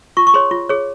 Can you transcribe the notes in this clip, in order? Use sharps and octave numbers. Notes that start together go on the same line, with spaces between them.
F4 C#6
C#6
G#4 C#5 C6
F4
G#4 C#5